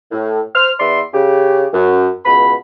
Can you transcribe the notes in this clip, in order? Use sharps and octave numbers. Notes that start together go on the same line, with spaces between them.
A2
C5 F6
E2 B4 D5 E5 C6
C#3 G4
F#2
C#2 B2 B5